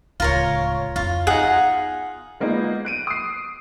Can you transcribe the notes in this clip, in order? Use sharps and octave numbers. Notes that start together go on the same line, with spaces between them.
D1 C#2 F4 A#4 C#5
F2 E4 F4
B3 D#4 G#4 F#5
G#3 A#3 B3 D#4 F4
F#6 D7 D#7
D#6 C7